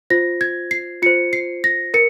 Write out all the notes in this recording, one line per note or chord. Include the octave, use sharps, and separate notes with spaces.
F4 C5 A#6
G#6
C7
F4 C5 C#7
C7
A#6
A#4 C#7